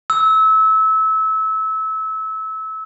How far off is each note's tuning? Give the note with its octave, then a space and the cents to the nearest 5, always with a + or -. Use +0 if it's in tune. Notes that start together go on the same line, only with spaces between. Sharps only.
E6 -25